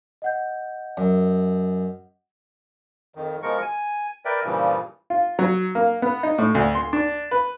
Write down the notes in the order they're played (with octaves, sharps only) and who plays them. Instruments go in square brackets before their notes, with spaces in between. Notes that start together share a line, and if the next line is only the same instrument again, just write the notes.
[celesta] D#5 F#5 G6
[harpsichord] F#2
[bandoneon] F2 D#3
B2 F3 G#3 A#4 C#6
G#5
A#4 B4 D5 E5 G5
G2 A#2 C#3 E3 F3 G3
[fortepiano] F4
F#3
A#3
B3
D#4
A2
D2
C6
D4
B4